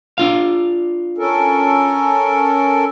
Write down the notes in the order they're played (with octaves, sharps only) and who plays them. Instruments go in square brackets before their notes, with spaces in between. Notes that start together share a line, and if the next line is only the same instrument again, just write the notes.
[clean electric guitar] D4 F4 F5
[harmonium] C#4 A4 A#4